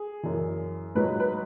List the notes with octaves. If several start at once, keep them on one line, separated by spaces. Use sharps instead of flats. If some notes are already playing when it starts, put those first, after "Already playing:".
Already playing: G#4
F#2 E3
G#2 F#3 B4
B4